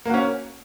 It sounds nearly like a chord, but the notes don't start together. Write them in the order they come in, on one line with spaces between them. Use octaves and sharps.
A#3 F#4 C#4